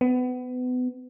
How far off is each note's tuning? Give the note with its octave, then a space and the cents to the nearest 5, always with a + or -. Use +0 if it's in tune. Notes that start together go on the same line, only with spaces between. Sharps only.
B3 +30